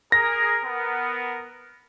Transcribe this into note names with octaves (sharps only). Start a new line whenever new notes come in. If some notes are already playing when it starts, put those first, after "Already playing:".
G#4 A#4 A#6
B3 A#4